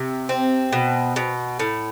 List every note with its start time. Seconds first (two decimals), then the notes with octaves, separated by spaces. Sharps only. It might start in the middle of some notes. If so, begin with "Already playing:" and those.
Already playing: C3
0.29 C4
0.72 B2
1.16 B2
1.59 A2